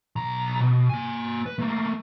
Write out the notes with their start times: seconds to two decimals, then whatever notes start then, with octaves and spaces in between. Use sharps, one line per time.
0.16 B1 A#5
0.60 B2
0.89 A#3 G#5
1.46 B4
1.59 A3 A#3